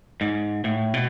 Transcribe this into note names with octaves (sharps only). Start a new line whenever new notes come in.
G#2
A2
B2